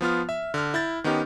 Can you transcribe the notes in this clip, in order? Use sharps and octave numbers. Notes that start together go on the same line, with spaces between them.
F3 B3 F4 F6
E5
D3 F6
E4 G6 A6
D#3 B3 C#4 D#4 G4